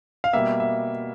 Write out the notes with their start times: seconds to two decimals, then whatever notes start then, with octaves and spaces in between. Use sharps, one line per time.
0.24 F5
0.33 B2 G3 A#3 E5
0.60 E5